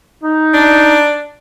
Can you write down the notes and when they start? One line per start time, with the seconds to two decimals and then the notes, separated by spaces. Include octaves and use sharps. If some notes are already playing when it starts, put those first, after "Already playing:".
0.23 D#4
0.54 D4